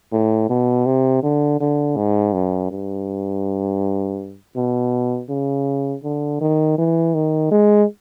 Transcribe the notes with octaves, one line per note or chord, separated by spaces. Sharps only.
A2
B2
C3
D3
D3
G#2
F#2
G2
B2
C#3
D3
D#3
E3
D#3
G#3